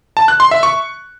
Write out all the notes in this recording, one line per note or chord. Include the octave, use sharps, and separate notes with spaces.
A5
F#6
C6
E5
C#6